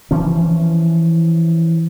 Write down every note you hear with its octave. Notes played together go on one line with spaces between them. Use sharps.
E3 F3 C#4